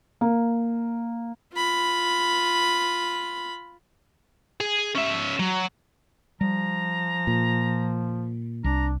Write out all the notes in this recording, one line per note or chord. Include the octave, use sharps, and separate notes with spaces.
A#3
F4 B5
G#4
C#4 E5
F#3
F3 G3 A#5
A#2
C2 D4 A#5